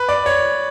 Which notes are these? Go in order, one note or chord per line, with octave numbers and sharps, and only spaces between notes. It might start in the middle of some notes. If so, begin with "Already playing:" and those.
Already playing: B4
D5
C#5